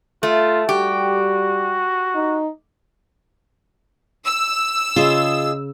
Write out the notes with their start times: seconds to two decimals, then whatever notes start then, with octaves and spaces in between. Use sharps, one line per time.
0.23 A3 F4
0.69 G3 F#4 G4
2.15 D#4
4.26 E6
4.96 C#3 F4 G#4 D#5